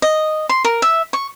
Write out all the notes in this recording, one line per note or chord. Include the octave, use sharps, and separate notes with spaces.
D#5
C6
A#4
E5
C#6